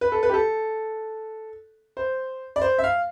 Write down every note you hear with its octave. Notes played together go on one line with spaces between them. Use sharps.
B4
A4
B4
G4
A4
C5
D5
C5
E5
F5